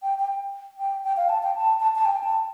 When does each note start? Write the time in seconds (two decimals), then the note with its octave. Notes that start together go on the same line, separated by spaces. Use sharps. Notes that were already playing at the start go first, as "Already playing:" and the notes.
0.03 G5
0.20 G5
0.78 G5
1.04 G5
1.17 F5
1.29 A5
1.43 G5
1.55 A5
1.80 A5
1.95 A5
2.05 G5
2.23 A5